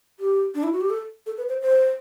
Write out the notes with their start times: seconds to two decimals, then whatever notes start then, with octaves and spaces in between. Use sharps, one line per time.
0.20 G4
0.55 D4
0.63 E4
0.72 F#4
0.81 G4
0.90 A4
1.26 A4
1.38 B4
1.49 C5
1.62 C5